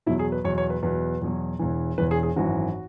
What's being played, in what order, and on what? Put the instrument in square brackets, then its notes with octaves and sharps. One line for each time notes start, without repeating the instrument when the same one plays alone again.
[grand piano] E2 B2 F#3 E4
G#4
B4
E2 B2 F#3 C#5
C#5
B4
E2 B2 F#3 B4
E2 B2 F#3
E1 E2 E3
E1 E2 E3 B4
G#4
G#4
G#1 F#2 E3 F#4